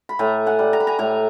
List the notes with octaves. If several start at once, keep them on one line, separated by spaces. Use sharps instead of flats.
B5
A2 G#5 A#5
F#5 G#5
G3
A#5
B5
G#5 A#5
A2 G#5 A#5